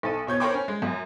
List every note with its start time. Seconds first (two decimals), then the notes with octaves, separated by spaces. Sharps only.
0.03 B1 A4 D#7
0.27 B2 C#5 G6 G#6
0.40 A#4 C5 C#5 G5 B5 D6
0.54 C#4
0.68 G#3
0.82 F#2